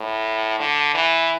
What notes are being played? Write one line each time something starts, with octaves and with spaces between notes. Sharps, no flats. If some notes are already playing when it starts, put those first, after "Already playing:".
Already playing: A2
D3
E3